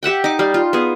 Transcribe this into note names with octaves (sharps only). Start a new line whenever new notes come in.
G4 E5 F#5 G5
D#4 D6
G3 F5
F4
B3 G#4